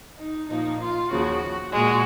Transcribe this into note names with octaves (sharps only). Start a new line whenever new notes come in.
D#4
A#2 F3 A#3 D#4
F4
D#2 C#3 F3 F#4
A#2 G#3 F#4